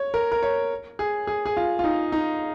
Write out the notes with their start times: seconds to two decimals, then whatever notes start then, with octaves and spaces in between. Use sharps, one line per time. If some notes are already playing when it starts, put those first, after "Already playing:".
Already playing: C#5
0.14 A#4
0.32 A#4
0.43 C#5
0.99 G#4
1.27 G#4
1.46 G#4
1.57 F4
1.79 F4
1.84 D#4
2.12 D#4